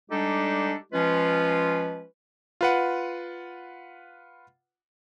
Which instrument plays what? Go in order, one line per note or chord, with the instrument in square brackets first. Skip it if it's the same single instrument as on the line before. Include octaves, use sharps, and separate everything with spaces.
[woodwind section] G3 G#3 D4 D#4 G4 A4
F3 G#3 C#4 F4 B4
[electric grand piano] F4 B4 F#5